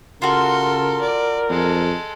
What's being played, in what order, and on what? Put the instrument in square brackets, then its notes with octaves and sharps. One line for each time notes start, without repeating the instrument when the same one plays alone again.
[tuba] C#3 [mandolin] F4 F#4 [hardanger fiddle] A4 C6 [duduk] A#4
[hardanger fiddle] D5
[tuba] F2 [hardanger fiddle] G#3 A4